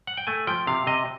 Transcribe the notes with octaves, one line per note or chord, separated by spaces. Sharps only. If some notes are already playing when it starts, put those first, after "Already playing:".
F#5
G5
A3 G#5
F3 G5
C3 F5
C3 D#5